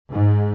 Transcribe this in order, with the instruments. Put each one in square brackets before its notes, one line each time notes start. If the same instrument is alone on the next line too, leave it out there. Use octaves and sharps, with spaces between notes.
[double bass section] G#2